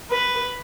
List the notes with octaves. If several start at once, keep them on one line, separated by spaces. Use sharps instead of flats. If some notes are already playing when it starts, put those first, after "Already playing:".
B4